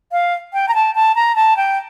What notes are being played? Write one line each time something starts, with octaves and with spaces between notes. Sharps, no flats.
F5
G5
A#5
A5
A5
A#5
A5
G5